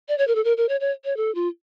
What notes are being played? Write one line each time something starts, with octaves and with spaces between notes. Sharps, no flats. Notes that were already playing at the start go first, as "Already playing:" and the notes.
D5
C#5
A#4
A4
A#4
A#4
C#5
C#5
C#5
A4
F4